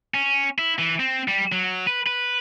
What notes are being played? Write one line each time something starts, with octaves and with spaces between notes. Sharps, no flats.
C#4
E4
E3
C4
G3
F#3
B4
B4